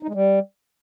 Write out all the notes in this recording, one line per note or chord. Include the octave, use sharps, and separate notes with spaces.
D#4
G#3
G3